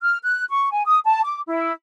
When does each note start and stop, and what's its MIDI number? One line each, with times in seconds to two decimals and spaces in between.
0.02 0.18 89
0.24 0.44 90
0.50 0.71 85
0.72 0.83 80
0.86 1.00 87
1.05 1.21 81
1.24 1.40 86
1.48 1.71 64